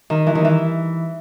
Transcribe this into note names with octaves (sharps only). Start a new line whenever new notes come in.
D#3
E3
D#3
E3